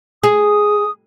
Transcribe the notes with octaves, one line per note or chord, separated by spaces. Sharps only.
G#4 D#6